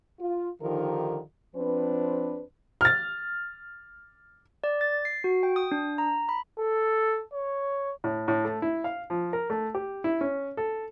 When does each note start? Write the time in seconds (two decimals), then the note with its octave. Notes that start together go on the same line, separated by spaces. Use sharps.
0.19 F4
0.62 D3 D#3 F3 D#4 G4 A#4
1.55 F3 C4 D4 B4
2.81 F6 A6
4.64 D5
4.81 A6
5.05 C7
5.24 F#4
5.43 G5
5.56 D#6
5.72 D4
5.98 A#5
6.29 B5
6.60 A4
7.33 C#5
8.04 A2
8.28 A2
8.45 A3
8.62 E4
8.84 F5
9.10 F3
9.33 A#4
9.50 A3
9.75 G4
10.04 E4
10.21 C#4
10.57 A4